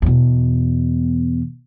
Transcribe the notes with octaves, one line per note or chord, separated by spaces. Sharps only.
E2 B2